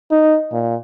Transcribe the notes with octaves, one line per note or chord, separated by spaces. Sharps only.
D#4
A#2